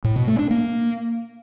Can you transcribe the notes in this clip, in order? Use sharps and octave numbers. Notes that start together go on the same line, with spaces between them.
A2
B2
A3
D4
A#3